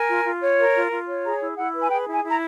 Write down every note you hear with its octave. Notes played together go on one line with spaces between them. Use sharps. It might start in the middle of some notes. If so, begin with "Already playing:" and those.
Already playing: A#4 G#5
F4
F4
C#5
A#4
F4
F4
C#5
G#4 A#5
E4
E4 F#5
B4
G#5
G#4 G5
E4
G#5
E4
A#5